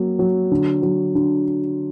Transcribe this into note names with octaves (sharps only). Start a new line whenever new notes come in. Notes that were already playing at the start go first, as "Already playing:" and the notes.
Already playing: F#3 A#3
F#3
D3
F#3
D3